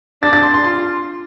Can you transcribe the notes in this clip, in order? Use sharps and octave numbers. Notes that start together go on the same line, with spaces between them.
D4 A6
A6
C6
C6
F4 C6